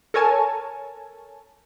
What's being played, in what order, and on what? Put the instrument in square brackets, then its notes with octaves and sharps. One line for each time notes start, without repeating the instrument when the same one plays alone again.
[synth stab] A4 A#4 C#5 G#5 A5